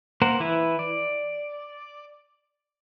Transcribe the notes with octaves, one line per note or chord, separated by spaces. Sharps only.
A#3 A#4 C5 F#5
E3 E4 B4
D5